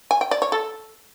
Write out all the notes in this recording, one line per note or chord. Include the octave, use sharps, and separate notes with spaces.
G#5
G5
D5
C#5
A4